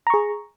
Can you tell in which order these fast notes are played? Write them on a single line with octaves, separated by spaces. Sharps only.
A#5 C#6 G#4